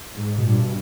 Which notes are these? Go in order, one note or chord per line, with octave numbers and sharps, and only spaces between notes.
G#2
B2
G2 A#2
B2